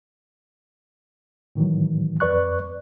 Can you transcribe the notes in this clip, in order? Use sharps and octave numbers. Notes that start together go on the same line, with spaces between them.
A2 D#3 E3 F#3
F2 B4 D5 C#6 F#6